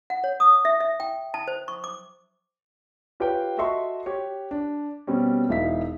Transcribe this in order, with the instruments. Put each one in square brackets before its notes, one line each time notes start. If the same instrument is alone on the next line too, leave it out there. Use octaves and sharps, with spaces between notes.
[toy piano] F#5
C#5
D#6
E5
E5
G5
A5
C5
C#6
D6
[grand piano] F4 G4 B4 C#5 F5 G5
F#4 A4 D#5 E5 C6 C#6
G4 C#5
D4
B2 G3 C4 C#4
E1 D#4 E4 E5 F5 B6